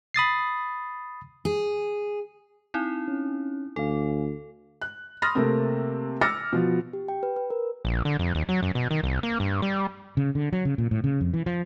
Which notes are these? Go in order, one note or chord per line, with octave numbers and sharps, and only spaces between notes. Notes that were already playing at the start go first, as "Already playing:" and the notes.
B5 D#6 A6 C7
G#4
C4 D#4 E4
C#4
D2 A4 F5 G#5
F#6
B5 C6 D#6 F6 A6 A#6
C3 A3 A#3 C4
D6 E6 F6 A6 A#6 C#7
B2 F3
G4
G5
B4
B4
A#4
A#1
D3
F2
D#2
F#3
F#2
B2
D#3
C2
A#3
G2
G3
C#3
D3
F#3
C#3
A#2
A2
C#3
F2
E3
F3